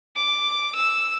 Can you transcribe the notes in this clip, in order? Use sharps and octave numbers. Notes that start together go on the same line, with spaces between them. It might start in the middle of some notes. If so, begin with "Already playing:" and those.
D6
E6